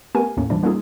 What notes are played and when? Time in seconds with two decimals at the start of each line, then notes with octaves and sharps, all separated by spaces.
0.15 A3 B3 G4 A#4 G#5
0.37 D#2 A2 A#3 C#4
0.50 B2 E3 F3 G3 D4
0.63 G3 A#3 C#4 D#4 F4 G#4